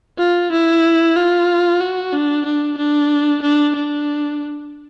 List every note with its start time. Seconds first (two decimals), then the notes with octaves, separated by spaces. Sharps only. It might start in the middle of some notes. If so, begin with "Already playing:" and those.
0.19 F4
0.52 E4
1.16 F4
1.80 F#4
2.13 D4
2.46 D4
2.78 D4
3.42 D4
3.76 D4